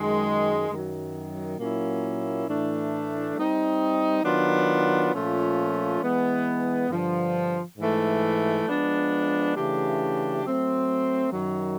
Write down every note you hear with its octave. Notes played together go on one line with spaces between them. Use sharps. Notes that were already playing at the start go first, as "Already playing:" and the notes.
Already playing: F#2 D#3 G#3
F#2 D#3 F#3
A#2 F#3 A#3 C#4 E4
A2 E3 A3 D4
G3 C4 D#4
D#3 F#3 B3 D4 F4
A#2 F3 A3 C#4 F4
E3 G#3 B3
G2 D3 F3
G#2 E3 A3
F3 G#3 B3 D4
C#3 E3 A3 D4 G4
F#3 A3 C4
F#2 D#3 F#3